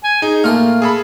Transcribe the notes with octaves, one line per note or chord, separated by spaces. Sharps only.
G#5
D#4 G#4
A#2 A3 A#3 C6 F6
G#4 A4 B5